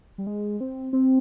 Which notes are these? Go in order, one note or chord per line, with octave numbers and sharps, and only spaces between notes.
G3
G#3
C4
C4